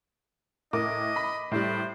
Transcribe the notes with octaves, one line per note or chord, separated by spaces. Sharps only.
A2 A#4 D#5 D6
B5
A2 G3 C5